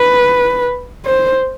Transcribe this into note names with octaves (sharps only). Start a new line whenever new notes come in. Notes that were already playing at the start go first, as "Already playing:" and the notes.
Already playing: B4
C5